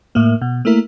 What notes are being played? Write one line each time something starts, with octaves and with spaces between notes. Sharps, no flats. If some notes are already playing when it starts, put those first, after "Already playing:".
A2 A#3
B2
A3 A#3 E4 A#4